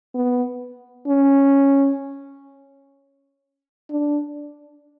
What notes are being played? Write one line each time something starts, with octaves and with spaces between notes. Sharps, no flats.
B3
C#4
D4